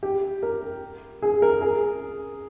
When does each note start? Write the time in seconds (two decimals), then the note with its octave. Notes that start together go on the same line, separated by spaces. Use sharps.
0.03 G4
0.43 A#4
1.22 G#4
1.42 A#4
1.62 G#4